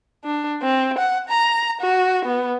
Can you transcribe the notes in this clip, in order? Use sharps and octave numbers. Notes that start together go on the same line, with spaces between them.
D4
C4
F#5
A#5
F#4
B3